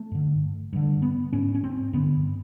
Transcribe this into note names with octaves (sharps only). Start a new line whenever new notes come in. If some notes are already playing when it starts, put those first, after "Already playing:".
Already playing: A3
G2 D3
G2 D3
B3
G#2 C#4
C#4
C4
G2 D3 B3